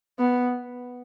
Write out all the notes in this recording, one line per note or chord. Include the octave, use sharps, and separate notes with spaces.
B3